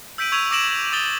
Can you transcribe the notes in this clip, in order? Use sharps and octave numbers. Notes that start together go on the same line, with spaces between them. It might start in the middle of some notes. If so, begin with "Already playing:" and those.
E6 G6 B6 D7 D#7 F#7
C#6 E6 G#6 D#7 F7
D6 E6 A#6 D7 E7 F#7
D6 D#6 A6 D7 G7